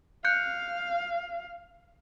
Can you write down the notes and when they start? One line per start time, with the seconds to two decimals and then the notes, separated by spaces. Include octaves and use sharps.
0.25 F5 F#6 G6 C#7